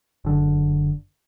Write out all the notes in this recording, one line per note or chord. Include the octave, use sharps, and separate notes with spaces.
F#1 D3